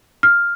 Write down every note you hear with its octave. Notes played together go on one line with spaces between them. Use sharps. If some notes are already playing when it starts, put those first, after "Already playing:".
F6